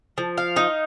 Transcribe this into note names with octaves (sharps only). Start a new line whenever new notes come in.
F3
F5
D#4